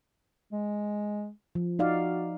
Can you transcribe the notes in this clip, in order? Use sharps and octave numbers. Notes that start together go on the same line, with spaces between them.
G#3
F3
D#4 F#4 D5 F5